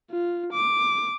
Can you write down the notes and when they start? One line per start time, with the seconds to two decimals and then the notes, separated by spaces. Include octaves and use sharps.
0.11 F4
0.53 D6